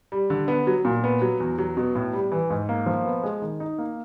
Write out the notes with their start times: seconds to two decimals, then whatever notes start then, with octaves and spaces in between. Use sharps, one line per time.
0.12 G3
0.30 D3
0.48 B3
0.67 F#3
0.85 A#2
1.04 B3
1.22 F#3
1.40 E2
1.59 F#3
1.77 B2
1.95 A2
2.13 G3
2.32 E3
2.50 G#2
2.69 A#3
2.86 F3
3.05 B3
3.23 G#3
3.42 D#3
3.60 D#4
3.78 A#3